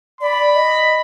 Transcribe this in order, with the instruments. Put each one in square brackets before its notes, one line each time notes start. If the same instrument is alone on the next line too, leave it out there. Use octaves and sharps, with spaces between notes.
[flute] D5 [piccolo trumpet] B5
[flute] D#5